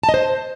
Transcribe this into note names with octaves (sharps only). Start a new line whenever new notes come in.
A5
D#5
C5